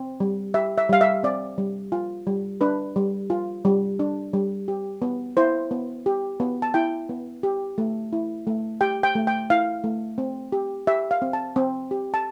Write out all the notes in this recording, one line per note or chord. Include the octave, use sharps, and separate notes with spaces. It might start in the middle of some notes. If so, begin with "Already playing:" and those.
Already playing: C4
G3
G4 E5
E5
G3 F5
E5
C4 D5
G3
F4
G3
D4 B4
G3
F4
G3
D4
G3
G4
B3
E4 C5
B3
G4
B3
A5
E4 G5
B3
G4
A3
E4
A3
G4 G5
G5
A3
G5
E4 F5
A3
C4
G4
G4 E5
F5
C4
A5
C4
G4
A5